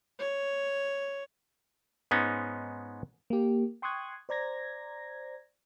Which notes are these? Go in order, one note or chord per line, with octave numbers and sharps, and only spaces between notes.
C#5
G#2 G#3 B3 C#4 D#4
A#3 G4
G5 C6 C#6 D#6 F#6 G#6
C5 D5 A#5 G#6 A#6